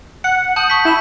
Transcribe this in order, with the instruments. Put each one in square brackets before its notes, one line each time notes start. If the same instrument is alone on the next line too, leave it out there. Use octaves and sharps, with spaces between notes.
[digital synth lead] F#5 [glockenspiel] C#7
[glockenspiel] A5 G6 F#7 [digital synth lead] D#6
[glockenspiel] C#6 G6 B6
[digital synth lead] E4 [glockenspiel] A5 E7